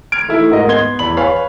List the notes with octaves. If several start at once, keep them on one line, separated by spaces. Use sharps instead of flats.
F6 G#6 D7
E3 A3 D#4 E4
G#2 A#4 D#5
B3 C6 G#6 G7
E2 B5 F#7
B4 C#5 F5 G#5 B5